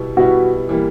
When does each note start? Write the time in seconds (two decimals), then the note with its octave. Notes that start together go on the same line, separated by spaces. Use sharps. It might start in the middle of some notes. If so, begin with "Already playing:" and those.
Already playing: B2 G3 B3 E4
0.17 B2 G3 B3 E4 F#4
0.69 E3 G3 A#3